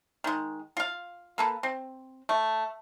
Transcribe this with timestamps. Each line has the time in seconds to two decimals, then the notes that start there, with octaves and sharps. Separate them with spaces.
0.24 D#3 G#3
0.77 F4 F5
1.38 A#3 A4 B4
1.63 C4
2.29 A3